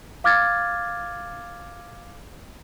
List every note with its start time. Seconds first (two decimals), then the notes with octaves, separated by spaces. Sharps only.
0.24 F5 D6 F6 G#6 A6